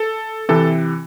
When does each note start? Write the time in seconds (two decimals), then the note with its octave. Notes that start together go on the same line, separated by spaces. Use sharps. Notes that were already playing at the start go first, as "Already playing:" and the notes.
Already playing: A4
0.49 C3 E3 A4